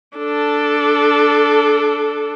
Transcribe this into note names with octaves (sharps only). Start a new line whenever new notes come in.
D4 A4